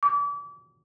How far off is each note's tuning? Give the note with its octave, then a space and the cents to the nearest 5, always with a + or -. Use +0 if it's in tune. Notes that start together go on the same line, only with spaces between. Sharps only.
D6 -35